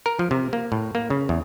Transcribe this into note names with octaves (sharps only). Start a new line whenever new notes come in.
A#4
F3
C3
A#3
A2
A#3
C#3
E2